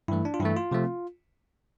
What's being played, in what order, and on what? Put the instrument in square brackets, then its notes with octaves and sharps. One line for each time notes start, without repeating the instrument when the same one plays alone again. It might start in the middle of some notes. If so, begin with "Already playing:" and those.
[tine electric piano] G2 E3 A3 E4
D4
F4
G2 E3 A3 E4
F4
C3 F3 A3 C4